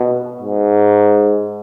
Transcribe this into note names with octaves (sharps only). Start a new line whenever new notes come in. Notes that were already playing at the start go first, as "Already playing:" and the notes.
Already playing: B2
G#2